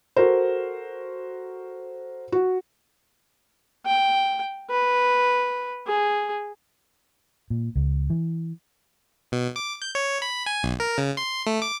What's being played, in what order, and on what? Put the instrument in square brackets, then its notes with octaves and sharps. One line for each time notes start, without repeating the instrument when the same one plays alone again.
[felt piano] F#4 A4 A#4 C5
F#4
[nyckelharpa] G5
B4
G#4
[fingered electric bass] A#2
C#2
E3
[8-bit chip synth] B2
D6
G6
C#5
B5
G#5
B1
A#4
C#3
C6
A3
D6